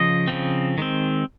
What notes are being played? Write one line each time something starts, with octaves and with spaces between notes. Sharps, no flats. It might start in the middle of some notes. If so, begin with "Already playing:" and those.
Already playing: C#3 F3 D#5
C#3 F3 C4
D#3 G#3 C4